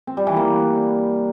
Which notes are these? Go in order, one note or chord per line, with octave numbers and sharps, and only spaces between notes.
C4
G3
E3
A#3